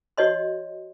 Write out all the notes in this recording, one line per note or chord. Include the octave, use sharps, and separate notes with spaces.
F#4 C#5 D#5 C6